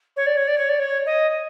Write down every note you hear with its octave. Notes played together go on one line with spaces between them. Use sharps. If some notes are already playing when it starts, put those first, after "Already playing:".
C#5
D5
C#5
D5
C#5
D5
C#5
D#5